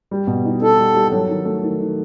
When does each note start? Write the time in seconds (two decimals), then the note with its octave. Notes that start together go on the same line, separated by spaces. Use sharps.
0.11 G3
0.27 B2
0.45 D#4
0.61 D#4 A4
0.78 G3
0.94 G3
1.12 F#3
1.29 D#3
1.45 A3
1.62 D#3
1.79 D#3